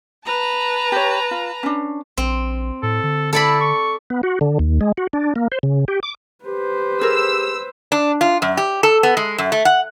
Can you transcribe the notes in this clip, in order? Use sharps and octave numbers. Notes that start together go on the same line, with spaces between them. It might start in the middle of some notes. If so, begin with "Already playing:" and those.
B4 A5 A#5
G4 C#5
F4
C#4 D4
A#1 C4
A2 A4
D3
E4 A4 D5 B5
C#6
B3
F#4
D3
D#2
G#3
F#4
D4
A#3
C5
C#3
G4
D6
G4 B4 C5
G#4 A#4 E6
D4
F4
F#2
G4
A4
B3
G#3
F#2
A3
F#5